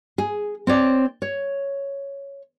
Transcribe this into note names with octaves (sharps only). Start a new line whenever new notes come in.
G#4
C4 C#5 D5
C#5